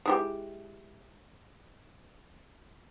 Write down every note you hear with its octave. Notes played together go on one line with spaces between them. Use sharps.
G#3 E4 G4